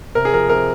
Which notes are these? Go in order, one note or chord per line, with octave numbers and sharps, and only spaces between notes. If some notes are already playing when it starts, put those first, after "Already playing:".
C3 A#4
G#4
F3 A#4
C3 A#4